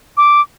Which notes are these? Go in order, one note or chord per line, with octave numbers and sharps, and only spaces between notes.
D6